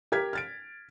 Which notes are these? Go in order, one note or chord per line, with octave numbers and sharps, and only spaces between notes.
G4 A#4 G#6 B6
F6 A6 D7